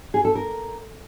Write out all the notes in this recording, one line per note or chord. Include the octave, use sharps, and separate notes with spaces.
G#4
A4
A#4